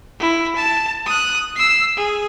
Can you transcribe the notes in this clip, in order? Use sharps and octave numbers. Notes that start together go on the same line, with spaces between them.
E4
A5
D#6 F#6
E6 C7
G#4